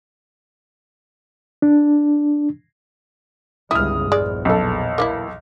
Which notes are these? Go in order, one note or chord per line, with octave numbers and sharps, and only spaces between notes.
D4
G1 C#2 G#3 E4 D#6 F6
A#1 E2 G#3 D5
B1 A4
A#3 D#4 E4